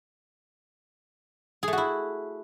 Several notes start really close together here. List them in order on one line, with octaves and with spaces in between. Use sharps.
G#4 A3 F#4 E4